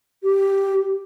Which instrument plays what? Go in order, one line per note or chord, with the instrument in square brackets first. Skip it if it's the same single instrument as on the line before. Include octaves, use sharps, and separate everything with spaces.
[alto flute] G4